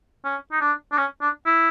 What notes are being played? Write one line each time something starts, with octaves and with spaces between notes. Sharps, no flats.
C#4
D#4
D4
D4
C#4
D4
E4